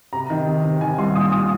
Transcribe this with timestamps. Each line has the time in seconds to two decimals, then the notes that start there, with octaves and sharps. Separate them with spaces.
0.13 C3 A#5
0.30 D#3
0.47 C3
0.64 C3
0.81 D#3 G#5
0.98 C2 C6
1.15 A#2 D#6
1.32 A#2 D#6